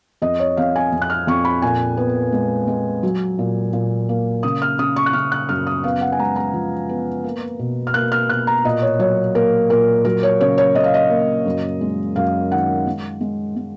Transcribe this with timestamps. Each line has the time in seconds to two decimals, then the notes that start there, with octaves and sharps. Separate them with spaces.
0.22 F2 D#5
0.40 C#5
0.57 F2 F5
0.76 G#5
0.93 F2
1.02 F#6
1.10 F6
1.27 F2 C#6
1.45 B5
1.62 A#2 G#5
1.97 B3
2.32 G#3
2.67 G#3
3.03 F#3
3.39 A#2
3.73 A#2
4.09 A#3
4.43 C#3 D#6
4.62 F6
4.79 C#3 D#6
4.96 C#6
5.06 F#6
5.13 C#3 F6
5.32 F#6
5.49 F#2 F6
5.67 D#6
5.84 B3 F5
6.01 F#5
6.12 G#5
6.19 G#3 A#5
6.36 A#5
6.54 F3
6.89 B3
7.24 A#3
7.59 B2
7.87 F6
7.94 A#3 F#6
8.12 F6
8.29 B2 F#6
8.47 A#5
8.64 A#2 D#5
8.82 C#5
8.99 F#3 C#5
9.35 A#3 A#4
9.70 A#2 A#4
10.05 F#3 A#4
10.23 C#5
10.41 C#3 C#5
10.58 C#5
10.75 C#3 D#5
10.84 F5
10.94 D#5
11.10 A#3
11.46 F#2
11.81 G#3
12.16 F#2 F5
12.51 D#3 F#5
12.87 G#3
13.21 G#3
13.56 G#3